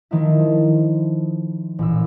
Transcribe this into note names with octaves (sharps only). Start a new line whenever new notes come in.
D#3 F3 A3 D#4 E4
F3
A1 A#2 E6